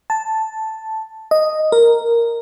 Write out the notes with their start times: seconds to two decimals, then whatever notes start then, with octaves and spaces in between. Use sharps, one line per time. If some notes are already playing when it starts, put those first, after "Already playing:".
0.10 A5
1.31 D#5
1.72 A#4